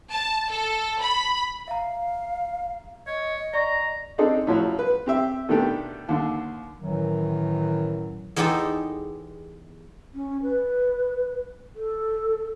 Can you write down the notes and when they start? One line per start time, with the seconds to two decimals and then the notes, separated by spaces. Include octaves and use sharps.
0.11 A5
0.51 A4
1.01 B5
1.68 E5 F5 A#5
3.07 C#5 D#5
3.54 D5 A#5 C#6
4.18 C4 D4 D#4 G#4 A4
4.47 A2 F3 F#3
4.79 B4
5.06 C4 G4 E5
5.49 B2 D#3 A3 D4 G4 A4
6.09 D#2 D3
6.80 F#2 A2 D#3 E3 F#3
8.36 E2 G#3 B3 D#4 G4 A4
10.14 C#4
10.42 B4
11.76 A4